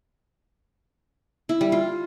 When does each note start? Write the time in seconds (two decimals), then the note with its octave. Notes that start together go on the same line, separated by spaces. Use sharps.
1.49 E4
1.61 G3
1.72 F4